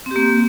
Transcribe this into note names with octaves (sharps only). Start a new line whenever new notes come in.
A#3 C4 G4